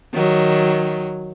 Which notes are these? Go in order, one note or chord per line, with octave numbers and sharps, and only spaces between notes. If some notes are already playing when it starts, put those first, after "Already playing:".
D#3 F#3